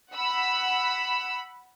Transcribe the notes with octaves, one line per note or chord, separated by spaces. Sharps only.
F#5 B5 E6